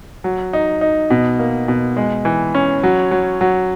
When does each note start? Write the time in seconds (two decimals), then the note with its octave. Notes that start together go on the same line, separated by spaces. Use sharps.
0.24 F#3
0.53 D#4
0.81 D#4
1.10 B2
1.39 A#3
1.68 B2
1.97 G#3
2.25 E3
2.55 C#4
2.83 F#3
3.11 F#3
3.41 F#3